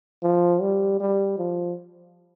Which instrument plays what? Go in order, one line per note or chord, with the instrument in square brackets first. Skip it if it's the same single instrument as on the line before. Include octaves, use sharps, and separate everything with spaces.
[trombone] F3
G3
G3
F3